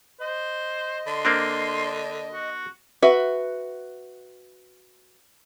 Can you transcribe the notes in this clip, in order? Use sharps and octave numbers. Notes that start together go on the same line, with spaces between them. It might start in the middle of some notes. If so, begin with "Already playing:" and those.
C5 D#5
D3 C6
A#3 C4 D4
F#4
F#4 B4 E5